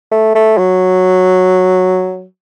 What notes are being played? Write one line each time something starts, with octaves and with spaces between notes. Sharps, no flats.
A3
A3
F#3